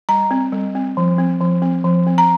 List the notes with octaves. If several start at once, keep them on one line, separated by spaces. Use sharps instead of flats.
G3 A#5
C4
G3
C4
F3
C4
F3
C4
F3
C4
A#5